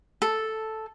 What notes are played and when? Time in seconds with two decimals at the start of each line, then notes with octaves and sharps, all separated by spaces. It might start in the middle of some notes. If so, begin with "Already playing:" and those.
0.22 A4